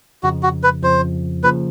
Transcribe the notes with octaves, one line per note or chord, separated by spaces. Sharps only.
F2 C#3 F3 F#4
F#4
B4
F2 C#3 F3 C5
C#3 F3 A#3 B4